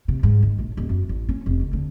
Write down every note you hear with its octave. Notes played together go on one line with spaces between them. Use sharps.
C3
G#2
D#3
A#1
D#1
F#2
A1
C#4
F1
C#2
D2